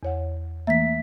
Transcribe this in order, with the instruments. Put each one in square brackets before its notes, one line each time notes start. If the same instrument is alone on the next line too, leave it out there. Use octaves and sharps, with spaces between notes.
[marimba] E2 C#5 F#5
[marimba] E3 A3 A#3 [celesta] E5 B6